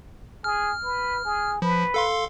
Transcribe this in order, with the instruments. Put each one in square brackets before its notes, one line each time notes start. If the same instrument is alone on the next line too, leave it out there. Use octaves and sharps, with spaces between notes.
[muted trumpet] G#4 [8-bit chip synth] F6
[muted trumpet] B4
G#4
[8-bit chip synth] F3 [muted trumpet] B4
[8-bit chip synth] A4 F5 C6